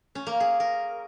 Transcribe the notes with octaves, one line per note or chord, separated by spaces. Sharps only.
C#4
A#3
G#4
A#4